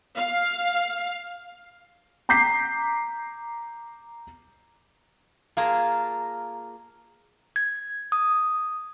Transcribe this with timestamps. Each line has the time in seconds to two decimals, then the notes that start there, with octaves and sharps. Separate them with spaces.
0.16 F5
2.29 A#5 D6 G6 B6 C7
5.57 A#3 F4 G#4 A5 A#5
7.56 G#6
8.12 D#6